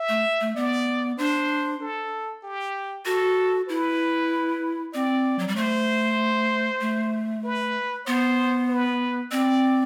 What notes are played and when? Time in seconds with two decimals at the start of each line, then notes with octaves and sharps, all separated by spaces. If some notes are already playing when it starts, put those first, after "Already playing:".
Already playing: E5
0.09 A3
0.41 A3
0.56 B3 D5
1.18 D4 C5
1.81 A4
2.43 G4
3.05 F#4 A4
3.68 E4 B4
4.94 C4 D5
5.39 F#3
5.48 G3
5.56 A3 C5
6.81 A3
7.44 B4
8.06 B3 C5
8.69 B4
9.31 C4 D5